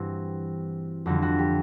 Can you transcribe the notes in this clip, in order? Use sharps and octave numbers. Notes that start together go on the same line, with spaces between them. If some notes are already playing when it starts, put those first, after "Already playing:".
Already playing: G2 E3 G3 C4 F#4
F2 D3 G3 F#4
F#4
G4